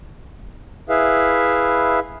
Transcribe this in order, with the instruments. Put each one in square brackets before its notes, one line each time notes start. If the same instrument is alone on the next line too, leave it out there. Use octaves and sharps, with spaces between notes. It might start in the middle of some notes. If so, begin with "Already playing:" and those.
[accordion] E4 G#4 B4 E5 F5